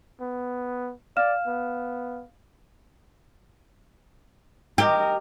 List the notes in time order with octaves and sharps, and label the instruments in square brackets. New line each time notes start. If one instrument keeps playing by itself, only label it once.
[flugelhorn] B3
[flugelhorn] D5 [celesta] F5 F6 E7
[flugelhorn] B3
[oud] G4 [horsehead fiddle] A#4 D#5